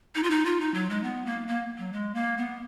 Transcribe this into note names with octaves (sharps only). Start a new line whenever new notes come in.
D#4
F4
D#4
F4
D#4
F#3
G#3
B3
A#3
A#3
F#3
G#3
A#3
B3